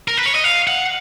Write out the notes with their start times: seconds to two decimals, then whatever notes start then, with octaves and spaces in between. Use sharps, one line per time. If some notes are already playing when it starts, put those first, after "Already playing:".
0.08 A#4
0.17 B4
0.26 C#5
0.35 D#5
0.44 F5
0.67 F#5